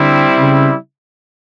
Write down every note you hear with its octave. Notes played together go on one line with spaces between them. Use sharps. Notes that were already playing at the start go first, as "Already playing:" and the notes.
Already playing: D3 G3 C4 E4
C#3